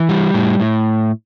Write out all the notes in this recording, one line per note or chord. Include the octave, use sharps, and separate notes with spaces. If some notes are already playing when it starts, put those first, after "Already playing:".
Already playing: E3
G3
A2
A2